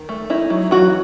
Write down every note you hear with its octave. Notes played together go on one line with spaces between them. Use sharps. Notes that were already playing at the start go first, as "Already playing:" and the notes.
Already playing: D#3
A3
D#4 E4
F#3
E3 F#3 F#4